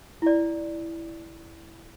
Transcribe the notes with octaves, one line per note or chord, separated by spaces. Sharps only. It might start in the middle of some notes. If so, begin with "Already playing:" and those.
E4 D5